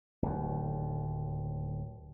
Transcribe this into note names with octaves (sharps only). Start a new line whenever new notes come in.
D1 D#2